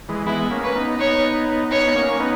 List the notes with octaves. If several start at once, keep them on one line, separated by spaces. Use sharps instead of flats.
E3 G#3
G#3 B3 E4
A#3 C#4
B4
B3 D#4
B3 D#4 C#5
B3 D#4 C#5
D#4
A#3 C#4
B3 D#4